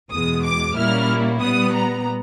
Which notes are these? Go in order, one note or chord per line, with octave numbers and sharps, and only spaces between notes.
E2 B2 G#3 D#6
D6
A#2 G3 A#3 C#4 E4 F6
A#2 G3 B3 D#6
A#5